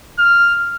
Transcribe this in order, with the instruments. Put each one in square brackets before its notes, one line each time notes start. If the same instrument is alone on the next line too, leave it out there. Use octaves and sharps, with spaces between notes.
[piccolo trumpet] F6